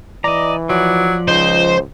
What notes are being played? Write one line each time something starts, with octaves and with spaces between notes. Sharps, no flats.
E3 D5 D#5 A#5
F3 F#3 D5
C#2 D#4 C5